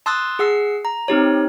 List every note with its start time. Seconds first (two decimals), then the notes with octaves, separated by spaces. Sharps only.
0.06 A5 C6 D#6 E6 F#6 A6
0.39 G#4 F#5 E6 C7
0.85 A#5
1.08 C4 D#4 G4 C#5